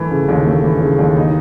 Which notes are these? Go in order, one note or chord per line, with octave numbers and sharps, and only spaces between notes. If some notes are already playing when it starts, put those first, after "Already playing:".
Already playing: E3 A3
C#3
D#2
A3
E3
C#3
D#2
D#4